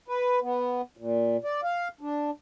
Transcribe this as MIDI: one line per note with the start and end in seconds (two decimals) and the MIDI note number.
0.08 0.39 71
0.42 0.81 59
0.97 1.37 46
1.44 1.61 74
1.63 1.88 77
2.01 2.31 62